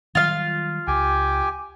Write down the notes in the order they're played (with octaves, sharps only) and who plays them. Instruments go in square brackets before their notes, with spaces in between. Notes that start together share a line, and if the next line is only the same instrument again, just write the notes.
[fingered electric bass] D#3 F#3 G3 [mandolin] F4 F5
[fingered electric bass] C#2 [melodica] G4 G5 G#5